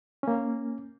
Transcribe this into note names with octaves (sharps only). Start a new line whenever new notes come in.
A#3 C#4